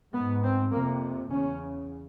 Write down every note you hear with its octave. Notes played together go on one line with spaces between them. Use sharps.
G#2 B3
C4
F2 C3 A#3
E2 C#3 C#4